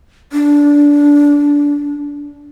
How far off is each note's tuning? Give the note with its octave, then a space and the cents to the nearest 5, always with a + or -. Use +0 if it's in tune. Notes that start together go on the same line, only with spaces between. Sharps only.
D4 -20